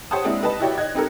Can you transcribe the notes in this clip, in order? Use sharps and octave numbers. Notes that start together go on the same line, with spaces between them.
G4 C5 C#5 F#5 A5 D#6
G#3 A#3 C4 D4 E4
D#4 G4 B4 D#5 A5
E4 F#4 G4 C#5 D5 G5
D#5 F#6 G#6
C4 D#4 G4 A4 A#4